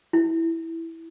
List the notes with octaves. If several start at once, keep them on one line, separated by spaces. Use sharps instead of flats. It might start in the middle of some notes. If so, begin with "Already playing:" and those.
E4